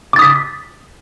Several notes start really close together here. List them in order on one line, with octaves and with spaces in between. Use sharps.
D6 A6 D#6 B6